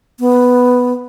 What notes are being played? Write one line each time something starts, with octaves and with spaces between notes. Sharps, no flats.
B3